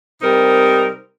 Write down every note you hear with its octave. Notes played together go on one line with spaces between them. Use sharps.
C3 G3 D#4 A#4 C5